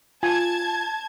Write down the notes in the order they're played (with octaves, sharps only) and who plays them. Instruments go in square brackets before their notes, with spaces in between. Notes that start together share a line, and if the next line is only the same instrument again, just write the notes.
[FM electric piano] F4 [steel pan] G#5 [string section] A5 G#6